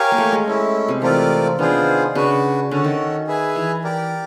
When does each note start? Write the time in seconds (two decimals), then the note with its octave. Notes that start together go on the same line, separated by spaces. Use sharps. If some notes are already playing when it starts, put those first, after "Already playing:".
Already playing: G4 A#4 C#5 F5 G#5
0.12 A#3
0.18 A3
0.32 G#3
0.46 A3 C#4 E4
0.88 C3
1.02 E3 A3 C4 F4 A#4 D5
1.58 D#3 B3 D4 F4 G#4 C5
2.15 C#3 D4 F#4 B4
2.71 D3 C#4 F#4 A4
2.84 D#3
3.27 G#4 B4 E5 G#5
3.56 E3
3.84 G4 A#4 D5